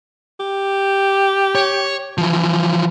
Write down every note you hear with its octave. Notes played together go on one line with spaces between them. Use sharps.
G4
C#5
E3 F3